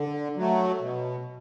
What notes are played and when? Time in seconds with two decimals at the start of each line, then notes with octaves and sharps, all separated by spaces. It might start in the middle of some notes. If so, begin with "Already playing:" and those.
Already playing: D3
0.37 F#3 A3
0.81 B2